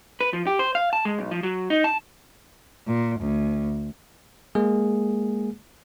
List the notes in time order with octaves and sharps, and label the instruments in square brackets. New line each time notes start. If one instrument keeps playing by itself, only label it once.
[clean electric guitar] B4
F3
G4
C5
F5
A5
G#3
B1
F3
F#3
D#4
A5
[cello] A#2
D2
[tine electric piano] G#3 A#3 G#4